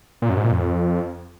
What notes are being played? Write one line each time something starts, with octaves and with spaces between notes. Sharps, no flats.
A#2
F#2
G#2
A#2
F2